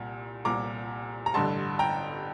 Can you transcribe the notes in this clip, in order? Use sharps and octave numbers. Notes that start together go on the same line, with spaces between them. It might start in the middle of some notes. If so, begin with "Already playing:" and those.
Already playing: C2 A#2
C2 A#2 A#5 D6
A#5
A1 G2 D3 A5 C6
G5 A#5